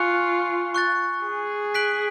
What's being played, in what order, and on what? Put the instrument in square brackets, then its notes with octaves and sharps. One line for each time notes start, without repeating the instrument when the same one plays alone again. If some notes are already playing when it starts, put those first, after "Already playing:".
Already playing: [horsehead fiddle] F4 [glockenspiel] G#5 C#6 F#6 C#7 F7
[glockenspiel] C#6 F#6 A6
[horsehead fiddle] G#4
[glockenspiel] F#6 B6 D7 F#7